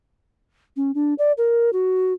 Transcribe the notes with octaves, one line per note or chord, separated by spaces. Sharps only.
C#4
D4
D5
A#4
F#4